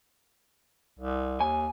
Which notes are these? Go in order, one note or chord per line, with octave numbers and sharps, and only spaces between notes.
C2
D#2 G#5